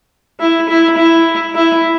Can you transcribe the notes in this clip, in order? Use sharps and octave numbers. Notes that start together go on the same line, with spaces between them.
E4
E4
E4
E4